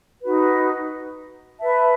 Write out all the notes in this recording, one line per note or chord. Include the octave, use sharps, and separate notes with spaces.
D#4 F#4 B4
B4 E5 A5